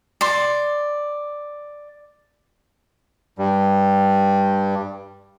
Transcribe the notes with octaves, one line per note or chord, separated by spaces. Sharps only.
D5 C6
G2 G3